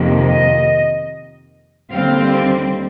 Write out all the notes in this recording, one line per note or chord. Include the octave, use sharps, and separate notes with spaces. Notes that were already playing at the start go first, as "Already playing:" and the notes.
Already playing: F2 C3 D#3 A#3
D#5
D#2 D3 G3 C4 F5